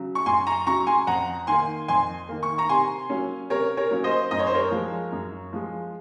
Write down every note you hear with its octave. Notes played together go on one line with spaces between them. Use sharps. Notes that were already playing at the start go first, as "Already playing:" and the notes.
Already playing: C#3 F#3
C#6
F#2 G#5 C6
A#5 C#6
C#3 F#3 A#5 C#6
G#5 C6
F2 F#5 A#5
D#3 A#3 G#5 C6
F2 G#5 C6
D#3 A#3
C#6
A#5 C#6
C3 G#5 C6
F#3 A#3 C#4
C3 A#4 C#5
A#4 C#5
F#3 A#3 C#4
C5 D#5
F#2 D#5
C#5
C5
A#4 C#5
F3 G#3
F#2
F3 G#3